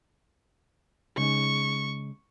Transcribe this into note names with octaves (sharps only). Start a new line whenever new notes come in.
C#3 G#3 D#4 C#6